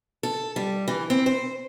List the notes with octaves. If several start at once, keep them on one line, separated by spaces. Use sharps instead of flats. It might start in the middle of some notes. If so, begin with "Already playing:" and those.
A4
G3
E3
C4
C5